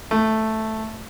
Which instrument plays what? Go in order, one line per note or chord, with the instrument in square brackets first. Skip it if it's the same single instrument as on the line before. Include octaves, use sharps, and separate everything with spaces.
[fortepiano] A3